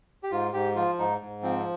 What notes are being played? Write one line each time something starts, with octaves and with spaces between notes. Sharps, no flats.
G4
G#2 F4
G#2 G4
F3 F4
G#2 D#4
G#2
F3 C4